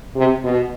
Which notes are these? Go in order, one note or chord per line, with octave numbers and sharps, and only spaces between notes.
C3
B2